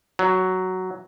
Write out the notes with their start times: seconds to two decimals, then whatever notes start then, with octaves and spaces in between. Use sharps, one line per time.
0.19 F#3